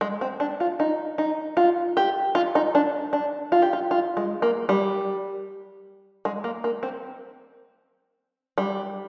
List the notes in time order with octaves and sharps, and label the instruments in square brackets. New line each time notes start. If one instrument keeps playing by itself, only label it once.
[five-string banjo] G#3
C4
D4
F4
D#4
D#4
F4
G4
F4
D#4
D4
D4
F4
G4
F4
F4
G#3
A#3
G3
G#3
A#3
A#3
C4
G3